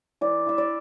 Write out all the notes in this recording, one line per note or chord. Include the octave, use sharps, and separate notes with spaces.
E3 D5
E3 E5
D5